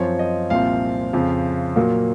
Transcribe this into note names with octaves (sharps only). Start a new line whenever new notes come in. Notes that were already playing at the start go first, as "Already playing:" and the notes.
Already playing: F#2 F3 C4 C#5
D#5
C2 A#2 F3 C4 F5
F2 C#3 F3
A#2 F#3 A#3